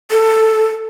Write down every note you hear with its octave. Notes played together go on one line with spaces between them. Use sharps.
A4